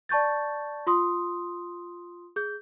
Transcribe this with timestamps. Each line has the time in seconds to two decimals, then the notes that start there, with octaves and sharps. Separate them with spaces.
0.09 D5 A5 C#6 G6 A6
0.87 F4 C6 D#6
2.36 G#4 G6